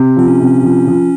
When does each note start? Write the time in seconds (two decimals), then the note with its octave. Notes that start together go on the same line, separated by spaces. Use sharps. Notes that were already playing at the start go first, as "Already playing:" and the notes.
Already playing: C3
0.16 F3 C4
0.28 C#4
0.40 C3
0.63 F3
0.87 F3